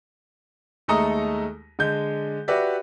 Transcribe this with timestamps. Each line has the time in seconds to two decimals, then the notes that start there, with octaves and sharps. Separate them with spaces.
0.88 D#2 G#3 A3 A4 A#5 D#6
1.79 D3 G#3 G6
2.48 F#4 G4 B4 D5 E5